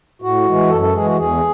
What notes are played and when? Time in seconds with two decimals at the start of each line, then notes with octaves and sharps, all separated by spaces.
0.22 A2 F#4
0.46 E3 G#3
0.69 F#2 A4
0.81 A4
0.93 E3 G#3 G#4
1.05 F#4
1.16 E2 G#4